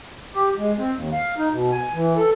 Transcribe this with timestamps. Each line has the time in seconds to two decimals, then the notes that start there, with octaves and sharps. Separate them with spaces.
0.35 G4
0.58 G#3
0.78 C4
0.92 D#2
1.12 F5
1.38 D#4
1.52 B2
1.71 G#5
1.93 E3
2.17 A4